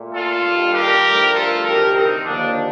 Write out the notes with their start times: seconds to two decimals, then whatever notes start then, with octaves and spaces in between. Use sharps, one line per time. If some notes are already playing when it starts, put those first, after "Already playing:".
Already playing: A#2 A3
0.14 F4 A4
0.44 G2 D#3 G3 A#3
0.74 G4 A#4
1.04 G2 F3 A3
1.34 F4 A4
1.65 D2 C3 D#3 G4 A#4
1.94 C4 D#4
2.25 D#2 D3 F3 A#3 D4